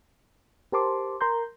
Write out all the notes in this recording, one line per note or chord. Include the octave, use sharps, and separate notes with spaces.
G4 A#4 C5 A5 C6 D6
A#4 A#5 C6 G6